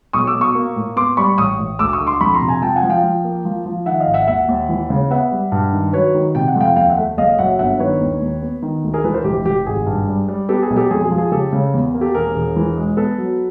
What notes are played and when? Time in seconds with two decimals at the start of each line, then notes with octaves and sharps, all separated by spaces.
0.13 B1 C#6 D#6
0.27 D6 E6
0.34 B2
0.41 C#6 D#6
0.55 A#3
0.76 A2
0.96 B3 C6 D6
1.17 G3 B5 C#6
1.38 A1 C#6 D#6
1.59 A1
1.79 D2 D6 E6
1.93 C#6 D#6
2.00 D3
2.07 C6 D6
2.21 F2 B5 C#6
2.35 A#5 C6
2.41 C3
2.48 G#5 A#5
2.62 F3 G5 A5
2.76 F#5 G#5
2.83 F3
2.90 F5 G5
3.03 F3
3.24 A#3
3.45 F3
3.66 F3
3.86 D#3 E5 F#5
4.00 D#5 F5
4.08 G#1
4.14 E5 F#5
4.27 D#2 E5 F#5
4.48 D#2
4.69 E3
4.90 C#3
5.10 B3 E5 F#5
5.31 G3
5.52 G2
5.73 D#3
5.93 F#3 B4 C#5
6.14 D#3
6.35 C3 G5
6.48 F#5
6.56 F2 F5 G5
6.76 D#2 F5 G5
6.90 E5 F#5
6.97 A3
7.17 F#1 D#5 F5
7.38 F#2 E5 F#5
7.59 G1 E5 F#5
7.80 D#3 B4 C#5
8.00 D#2
8.21 D#2
8.42 B3
8.62 D#3
8.83 D2
8.94 G#4 A#4
9.04 E3 A4 B4
9.14 A#4 C5
9.24 F1 G4
9.46 F1 G4
9.66 G#1 G#4
9.86 G2
10.08 G3
10.28 G3
10.49 B3 G4 A4
10.63 G#4
10.70 B1
10.76 G4 A4
10.90 F2 G#4
11.04 G#4
11.11 F3
11.18 G#4
11.32 C#3 G4 A4
11.53 C#3
11.74 E2
11.94 A#3
12.01 G4 A4
12.14 E1 G#4 A#4
12.36 E1
12.56 E3
12.77 G#3
12.97 B3 A4 B4
13.18 F#3